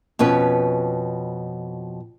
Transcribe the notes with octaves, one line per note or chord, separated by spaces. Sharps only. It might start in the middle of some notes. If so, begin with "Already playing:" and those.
F2 B2 C#4 B4